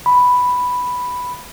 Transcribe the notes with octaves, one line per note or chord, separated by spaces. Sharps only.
B5